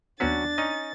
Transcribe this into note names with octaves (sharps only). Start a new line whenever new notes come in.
D#2 F#3 B3 C#4 D4 F#4 A6 B6
C#4 D#4 D#5